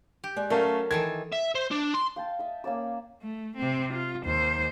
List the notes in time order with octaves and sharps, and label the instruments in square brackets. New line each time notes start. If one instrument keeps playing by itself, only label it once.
[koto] G4
[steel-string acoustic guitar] G#3 D5
[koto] F#3 [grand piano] A3 C#4 F5 [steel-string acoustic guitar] A#4 A5
[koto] D#3 E3 A4 [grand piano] G#6
[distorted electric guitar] E5
C5
D4
C6
[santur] F5 G5 A5
D#5 E5
A#3 C#4 D5 E6
[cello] A3
C3 C4
F4
D#2 C5